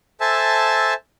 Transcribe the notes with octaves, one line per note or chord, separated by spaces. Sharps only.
A4 C5 E5 G#5 A5 E6